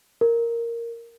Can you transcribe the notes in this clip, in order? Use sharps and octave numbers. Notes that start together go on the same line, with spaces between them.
A#4